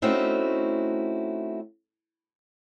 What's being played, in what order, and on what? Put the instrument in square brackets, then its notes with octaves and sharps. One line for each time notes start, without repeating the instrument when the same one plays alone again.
[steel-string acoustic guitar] A3 C4 C#4 D#4 E4 F#4